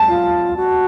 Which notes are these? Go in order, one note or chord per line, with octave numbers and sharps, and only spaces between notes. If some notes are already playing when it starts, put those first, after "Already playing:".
Already playing: A5
F4
F#4